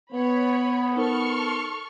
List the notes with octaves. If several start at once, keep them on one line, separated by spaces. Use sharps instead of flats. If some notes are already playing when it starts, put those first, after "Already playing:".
B3 C#5 B5
D#4 A4 A#4 C5 C#6 F6